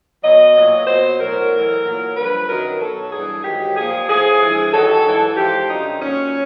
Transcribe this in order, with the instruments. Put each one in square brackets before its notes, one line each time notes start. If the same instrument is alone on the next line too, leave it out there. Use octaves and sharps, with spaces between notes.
[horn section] B2 F#3 D#5
A#2 F#3
B2 F#3 C5
A2 F#3 A#4
A2 E3
A#2 F#3
G2 D3 F3 B4
F#2 D#3 F#3 A#4
B2 F#3 A4
G2 E3 G#4
G#2 D#3 F#3 G4
A#2 F3 G#4
A2 F3 G#4
G2 E3
G2 D#3 F#3 A4
G#2 E3
G#2 F3 G4
F#2 D3 F#3 D#4
A#2 F#3 C#4